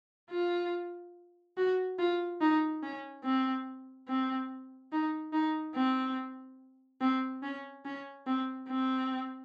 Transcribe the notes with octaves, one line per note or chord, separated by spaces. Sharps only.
F4
F#4
F4
D#4
C#4
C4
C4
D#4
D#4
C4
C4
C#4
C#4
C4
C4